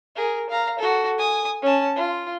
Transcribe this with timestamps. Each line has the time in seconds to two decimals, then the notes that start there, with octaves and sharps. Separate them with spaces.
0.16 G#4 A#4
0.49 F5 A#5
0.79 F#4 A4
1.18 G#5 D#6
1.62 C#4 A5
1.96 F4